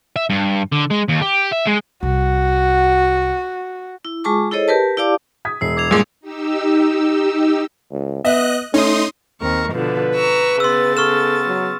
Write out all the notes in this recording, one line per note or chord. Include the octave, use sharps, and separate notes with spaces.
E5
G2
D3
G#3
D#2
G4
E5
G#3
C2 F#4
E4
G#3 F4 G#4 A5 C#6 D6
E4 G#4 A4 C5 C#5 D#5
G4 A#4 B4 A5
E4 G4 D5 F5 A5 D6
D#6 G#6 B6
E1 E6 C7
D6 G#6 F7
C2 G2 A#2 G#3
D#4 G4 E6
C#2
B3 D#5 E5 F#6
A3 C#4 D#4 C6 D#6
D#2 C4 A#4 C#6
B2 D3 F3 B4
A#5 C#6 E6
C#3 B3 C6 E6 A6
A4 C#6 F6 E7
F#3